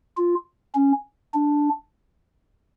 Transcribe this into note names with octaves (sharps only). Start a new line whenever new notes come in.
F4
C#4
D4